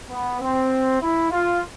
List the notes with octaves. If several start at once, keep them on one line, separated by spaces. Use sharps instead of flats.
B3
C4
E4
F4